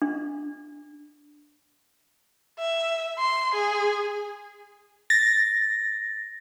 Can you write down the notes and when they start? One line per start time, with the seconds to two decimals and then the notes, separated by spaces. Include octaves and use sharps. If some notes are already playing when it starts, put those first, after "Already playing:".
0.02 D4
2.59 E5
3.19 C6
3.55 G#4
5.10 A6 A#6